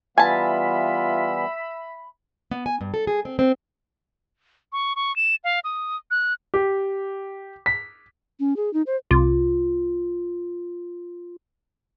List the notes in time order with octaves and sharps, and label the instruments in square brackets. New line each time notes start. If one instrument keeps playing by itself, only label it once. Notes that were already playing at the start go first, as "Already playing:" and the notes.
[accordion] E3 G3 B3 [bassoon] F4 [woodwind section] E5 B5 [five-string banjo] G#5 A5
[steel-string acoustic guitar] B3
G#5
G2
A4
G#4
C4
C4
[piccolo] C#6
C#6
E7
F5
D#6
F#6
[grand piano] G4
B6
[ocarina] C#4
G#4
D#4
C5
[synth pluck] C2 C3 D6 [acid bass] F4